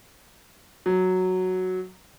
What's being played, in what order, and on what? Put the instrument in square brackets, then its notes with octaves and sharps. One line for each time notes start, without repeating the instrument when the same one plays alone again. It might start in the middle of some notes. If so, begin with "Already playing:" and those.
[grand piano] F#3